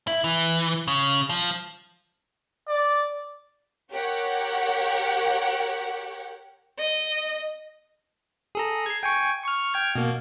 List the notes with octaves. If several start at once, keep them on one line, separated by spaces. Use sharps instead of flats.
E4
E3
C#3
F3
D5
G4 A#4 C#5 F#5
D#5
G#4 A4 A#5
G#6 C7
G5 G#5 C#6
C#6 F6
G5 F6 G#6
B2 A#3